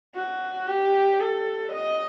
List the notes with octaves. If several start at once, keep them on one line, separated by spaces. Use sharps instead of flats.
F#4
G4
A4
D#5